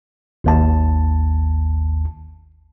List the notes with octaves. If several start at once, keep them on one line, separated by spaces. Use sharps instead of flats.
G#1 D#2 A5